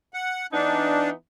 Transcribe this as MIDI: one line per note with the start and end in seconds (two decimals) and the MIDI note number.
0.14 0.47 78
0.53 1.11 52
0.53 1.11 59
0.53 1.10 62
0.53 1.11 63